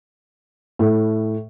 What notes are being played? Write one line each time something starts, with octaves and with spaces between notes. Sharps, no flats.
A2